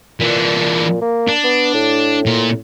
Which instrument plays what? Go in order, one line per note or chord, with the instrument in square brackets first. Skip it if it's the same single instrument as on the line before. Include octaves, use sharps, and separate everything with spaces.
[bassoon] A#2 [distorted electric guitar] E3 D4
[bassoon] A#3
[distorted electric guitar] D4
[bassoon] B3
A2
[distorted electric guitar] A#2